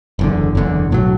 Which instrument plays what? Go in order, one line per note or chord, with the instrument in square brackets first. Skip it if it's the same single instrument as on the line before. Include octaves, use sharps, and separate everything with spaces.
[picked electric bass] F#1 E2 D3
F#1 E2 D3
B1 A2 F#3